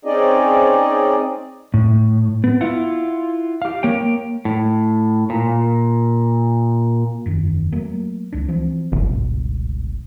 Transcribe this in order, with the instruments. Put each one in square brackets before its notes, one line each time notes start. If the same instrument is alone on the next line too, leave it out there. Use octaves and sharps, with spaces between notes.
[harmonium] C4 C#4 D#4 G#4 D5 D#5
[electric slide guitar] A2
B3
E4 F4 F#5
G4 F5
A#3 C#5 G5
A2
A#2
[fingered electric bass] E1 F#2 D#3
F#3 A3 A#3
C#2 D4
E3 F3 C4
[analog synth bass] G1 [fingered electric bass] C#2 G#2 B2